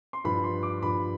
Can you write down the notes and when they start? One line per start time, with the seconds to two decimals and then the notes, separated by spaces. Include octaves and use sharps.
0.13 C6
0.24 G2 F3 B5
0.44 C6
0.63 D6
0.82 G2 F3 B5